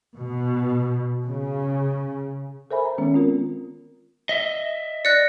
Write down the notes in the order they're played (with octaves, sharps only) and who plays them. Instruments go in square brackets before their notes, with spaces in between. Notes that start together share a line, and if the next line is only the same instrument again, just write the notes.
[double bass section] B2
C#3
[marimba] A4 A#4 C5 E5 G#5 B5
A#5
D#3 G#3 B3 C#4
C4 F4 A#4
[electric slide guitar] D#5 E5
[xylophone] D5 F#6 [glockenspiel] A#6 C#7